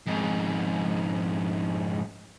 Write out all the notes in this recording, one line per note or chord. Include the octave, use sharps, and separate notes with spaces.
F2 G#2